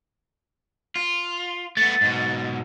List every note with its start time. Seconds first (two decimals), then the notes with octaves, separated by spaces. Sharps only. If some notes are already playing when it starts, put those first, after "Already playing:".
0.96 F4
1.77 A3 B3 A6
2.01 G#2 B2